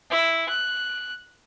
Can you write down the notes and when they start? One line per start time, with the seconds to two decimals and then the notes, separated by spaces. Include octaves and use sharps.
0.11 E4
0.49 F#6